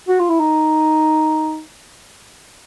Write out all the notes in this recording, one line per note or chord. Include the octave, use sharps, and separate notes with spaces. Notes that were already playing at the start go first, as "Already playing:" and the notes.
F#4
F4
E4
D#4